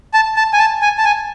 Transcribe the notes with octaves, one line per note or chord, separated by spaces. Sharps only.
A5
A5
G#5
A5
G#5
A5
G#5